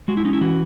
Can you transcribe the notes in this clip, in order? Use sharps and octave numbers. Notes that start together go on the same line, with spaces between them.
G#3 F#4
E4
C#4 D#4
E4
E3 F#4